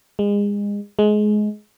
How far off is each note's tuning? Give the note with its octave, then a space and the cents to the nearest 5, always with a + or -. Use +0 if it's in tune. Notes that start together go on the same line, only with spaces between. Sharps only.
G#3 -30
G#3 +20